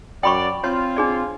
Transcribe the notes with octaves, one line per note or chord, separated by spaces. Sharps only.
F#2 F#3 D5 G5 B5 C#6
C4 F4 C#5
D4 G#4 D5